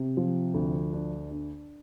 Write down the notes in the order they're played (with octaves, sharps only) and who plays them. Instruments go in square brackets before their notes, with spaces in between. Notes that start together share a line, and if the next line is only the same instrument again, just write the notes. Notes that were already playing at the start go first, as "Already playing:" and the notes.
Already playing: [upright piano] C3
F3
D2
D4
D4